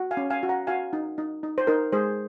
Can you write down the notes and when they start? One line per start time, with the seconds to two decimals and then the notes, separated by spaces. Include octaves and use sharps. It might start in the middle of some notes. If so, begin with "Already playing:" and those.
Already playing: F#4
0.11 F5 G#5
0.17 C#4
0.30 F5 G#5
0.43 F#4
0.49 F#5 A#5
0.67 F#4 F5 G#5
0.93 D#4
1.18 D#4
1.43 D#4
1.58 C5
1.67 D#4 A#4
1.93 G#3 G#4 C5